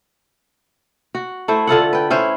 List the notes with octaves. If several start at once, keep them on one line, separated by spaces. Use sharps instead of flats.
F#4
A3 E4 C5
D3 F4 A4 F#5
B4 G5
C#4 E4 B4 C5